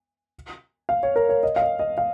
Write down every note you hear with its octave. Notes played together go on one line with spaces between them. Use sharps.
F5
C#5
A#4
C#5
D#5
F5
D#5
D#5
F5